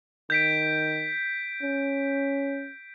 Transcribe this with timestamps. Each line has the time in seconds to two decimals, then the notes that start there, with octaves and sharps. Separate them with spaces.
0.30 D#3 G6 B6 D7
1.63 C#4